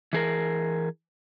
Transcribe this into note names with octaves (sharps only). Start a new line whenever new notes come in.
E3 G#4 A#4